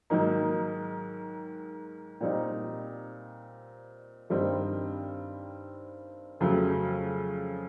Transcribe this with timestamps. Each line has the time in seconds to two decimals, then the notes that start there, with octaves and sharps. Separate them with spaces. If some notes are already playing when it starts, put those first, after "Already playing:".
0.10 G#2 D#3 F#3 A#3 D#4
2.21 A#2 G3 C4 D#4
4.30 G2 D#3 G3 C4 D#4
6.40 F2 C#3 F#3 A3